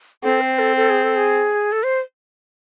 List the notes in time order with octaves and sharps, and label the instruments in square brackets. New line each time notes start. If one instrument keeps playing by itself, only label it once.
[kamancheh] C4 [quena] A4
[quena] C5
A4
A4
G#4
A4
G#4
A4
C5